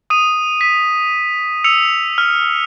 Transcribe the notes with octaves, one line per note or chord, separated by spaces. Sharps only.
D#6 D#7
B6
E6 C#7 F7
F6